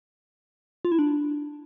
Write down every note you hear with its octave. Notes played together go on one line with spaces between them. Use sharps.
F4
E4
D4